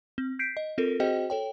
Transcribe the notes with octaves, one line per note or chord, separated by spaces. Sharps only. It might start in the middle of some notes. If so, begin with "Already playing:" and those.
C4
G6 B6 C7 D7
D#5
C4 F4 A4 A#4
C4 F#4 G#4 C5 D#5 G5
A4 C#5 G5